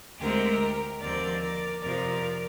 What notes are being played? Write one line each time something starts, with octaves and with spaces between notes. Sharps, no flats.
D2 D3 G#3 C4 G4 A#4
D#2 D3 F3 C4 A#4 D5
A#4 D5
F2 C3 F3 A#4 D5